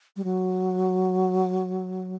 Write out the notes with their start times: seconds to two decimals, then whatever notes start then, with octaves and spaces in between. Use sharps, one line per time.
0.16 G3
0.24 F#3